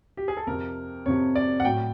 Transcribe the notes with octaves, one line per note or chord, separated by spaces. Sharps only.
G4
G#4
A4
F2 C3 F3 A#4
F2 C3 F3 C#5
D5
F#5
A2 F#3 G5